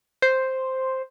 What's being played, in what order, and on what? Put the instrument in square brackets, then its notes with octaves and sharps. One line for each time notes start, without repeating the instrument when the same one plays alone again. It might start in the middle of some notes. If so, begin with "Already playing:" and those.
[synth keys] C5